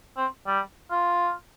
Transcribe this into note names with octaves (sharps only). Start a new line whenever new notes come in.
C4
G3
F4